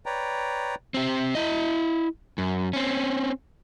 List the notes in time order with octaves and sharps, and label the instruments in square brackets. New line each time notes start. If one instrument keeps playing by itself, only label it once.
[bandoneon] B4 C#5 D5 G5 A#5
[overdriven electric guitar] C4 G4
E4 D#5
F#2
C4 C#4